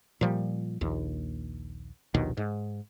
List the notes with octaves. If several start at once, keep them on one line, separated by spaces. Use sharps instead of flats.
A#2 F3 G3
A#1 D#2
A#1 D#2 B2 D#3
G#2